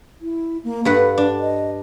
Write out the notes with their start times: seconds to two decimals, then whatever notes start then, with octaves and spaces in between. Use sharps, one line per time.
0.21 E4
0.64 A#3
0.85 G2 B4 F5 F#5
1.18 D4
1.40 D#5